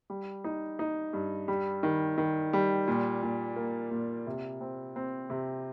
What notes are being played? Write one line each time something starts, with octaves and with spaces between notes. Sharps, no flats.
G3
D#4
D#4
G2
G3
D#3
D#3
G3
A#2
A#2
A#3
A#2
C3
C4
C4
C3